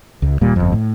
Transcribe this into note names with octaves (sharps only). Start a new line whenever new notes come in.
C#2
D#1 A#2 G3
G1 F2
A2